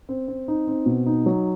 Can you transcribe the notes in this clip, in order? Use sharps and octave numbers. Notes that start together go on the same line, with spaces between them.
C4
C4
D#4
C4
B2
D#4
F#3